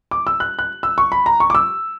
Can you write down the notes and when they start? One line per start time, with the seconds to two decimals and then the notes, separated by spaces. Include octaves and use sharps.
0.11 D6
0.27 E6
0.40 F#6
0.59 F#6
0.83 E6
0.98 C#6
1.12 B5
1.26 A#5
1.40 C#6
1.50 D6
1.55 E6